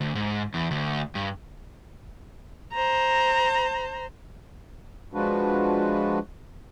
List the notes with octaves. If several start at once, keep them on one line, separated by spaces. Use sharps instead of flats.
D2
G#2
E2
D2
G2
C5 A#5
F3 G#3 D4 F4 F#4 B4